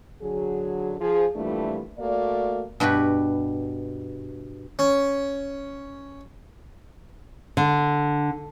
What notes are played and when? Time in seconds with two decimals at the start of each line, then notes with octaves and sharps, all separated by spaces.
0.22 D3 F#3 G#4
0.99 F3 G#4
1.35 F2 A#2 E3 G3 A3 D4
1.98 A3 A#3 F#4 D5
2.80 G2 B2 F#4 G4 B4
4.79 C#4
7.57 D3